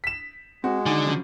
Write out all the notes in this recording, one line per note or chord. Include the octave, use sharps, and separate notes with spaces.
B6 E7
G#3 C4 F#4
D#2 D3 D#4 G#5
F#2 C#3 F3